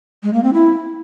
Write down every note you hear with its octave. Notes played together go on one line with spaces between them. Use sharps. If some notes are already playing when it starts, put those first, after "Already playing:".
G#3
A#3
C4
E4